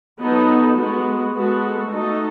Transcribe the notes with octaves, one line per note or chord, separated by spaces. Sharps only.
F#3 B3 D#4 A4
G#3 B3 F#4
G#3 B3 F#4 A4
A3 D#4 F#4 A4 D#5